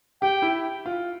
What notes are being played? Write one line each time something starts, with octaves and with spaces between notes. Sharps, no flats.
G4 G5
E4
F4